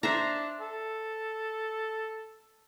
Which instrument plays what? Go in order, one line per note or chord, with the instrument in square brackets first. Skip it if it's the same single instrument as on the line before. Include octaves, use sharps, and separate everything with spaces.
[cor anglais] D4 [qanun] C5 E5 A#5
[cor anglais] A4